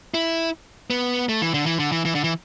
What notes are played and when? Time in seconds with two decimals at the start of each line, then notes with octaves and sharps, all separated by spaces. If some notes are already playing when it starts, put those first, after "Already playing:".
0.14 E4
0.90 B3
1.29 A3
1.42 E3
1.54 D3
1.66 E3
1.79 D3
1.92 E3
2.05 E3
2.15 D3
2.24 E3